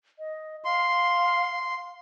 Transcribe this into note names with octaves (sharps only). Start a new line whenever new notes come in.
D#5
F5 C6